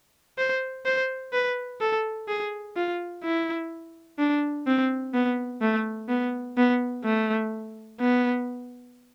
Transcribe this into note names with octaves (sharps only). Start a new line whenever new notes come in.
C5
C5
B4
A4
G#4
F4
E4
D4
C4
B3
A3
B3
B3
A3
B3